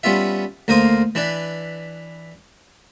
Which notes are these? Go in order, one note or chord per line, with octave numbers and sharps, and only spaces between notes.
G3 B3 C#4 F4 E5
D2 A#3 A#4 C5 F5 D#6
E3 D4 B4 D5